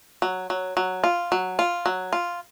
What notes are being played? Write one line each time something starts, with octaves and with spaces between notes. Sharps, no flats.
F#3
F#3
F#3
F4
F#3
F4
F#3
F4